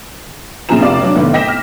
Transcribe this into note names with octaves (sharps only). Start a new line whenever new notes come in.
A#1 C#3 F3 G#4 A#5 E7
F1 C3 D5 F5 D6
F#3 D4
F1 A2 D#3 B3
D#5 G5 A#6 B6 E7
F6